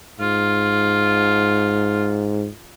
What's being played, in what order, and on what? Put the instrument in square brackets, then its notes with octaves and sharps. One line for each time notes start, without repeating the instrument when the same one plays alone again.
[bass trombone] G#2 [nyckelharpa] F4